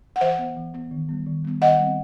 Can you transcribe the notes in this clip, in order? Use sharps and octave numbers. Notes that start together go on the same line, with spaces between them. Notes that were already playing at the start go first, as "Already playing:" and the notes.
F#5
E3 C5 E5
B3
E3
B3
D#3
G3 B3
D#3
G3 B3
D#3 D#5 F#5
G3 C4